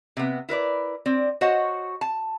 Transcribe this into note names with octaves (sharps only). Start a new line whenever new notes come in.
C3 B3
E4 A#4 B4 D5
C4 D5
F#4 C5 C#5 D#5 F#5
A5